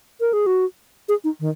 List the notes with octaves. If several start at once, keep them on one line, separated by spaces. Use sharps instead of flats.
A#4
G#4
F#4
G#4
D#4
D#3